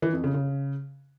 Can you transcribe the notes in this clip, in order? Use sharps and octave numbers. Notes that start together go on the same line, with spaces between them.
E3
F2
C#3
C#3